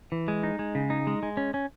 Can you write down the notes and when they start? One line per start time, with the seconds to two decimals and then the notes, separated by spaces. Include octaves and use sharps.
0.12 E3
0.28 G#3
0.43 D#4
0.59 G#3
0.75 C#3
0.90 D#4
1.07 G#3
1.23 G#3
1.37 C#4
1.54 C#4